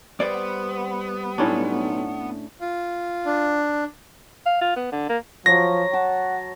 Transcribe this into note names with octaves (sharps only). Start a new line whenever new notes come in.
G3 B3 C5 D5
B1 A2 C#4 D4
F4
D4
F5
F4
B3
D3
A#3
F3 F#3 C#5 A#6
F#5 A5